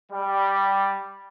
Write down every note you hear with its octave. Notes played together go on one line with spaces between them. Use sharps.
G3